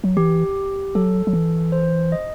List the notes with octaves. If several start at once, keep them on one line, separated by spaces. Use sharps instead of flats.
F#3
E3 G4
F#3 A4
F#3
E3
C5
D#5